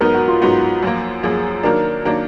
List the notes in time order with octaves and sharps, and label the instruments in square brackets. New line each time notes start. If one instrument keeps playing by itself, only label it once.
[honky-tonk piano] G#2 F#3 B3 D#4 [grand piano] A#4
[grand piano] F#4
F4
[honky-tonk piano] G#2 F#3 B3 D#4 [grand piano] F#4
[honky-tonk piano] F#2 F3 A#3
[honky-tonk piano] F#2 F3 A#3 [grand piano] G#4
[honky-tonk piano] D#3 F#3 A#3 D4 [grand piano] A#4
[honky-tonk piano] D#3 F#3 A#3 D4